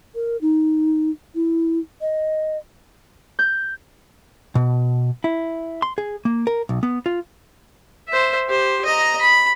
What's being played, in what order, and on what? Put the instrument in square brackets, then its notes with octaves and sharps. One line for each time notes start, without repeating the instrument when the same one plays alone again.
[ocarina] A#4
D#4
E4
D#5
[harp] G6
[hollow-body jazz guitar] B2
E4
C6
G#4
A#3
A#4
B1
B3
F4
[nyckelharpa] C5 E5
G4 C5
D#5 A#5
B5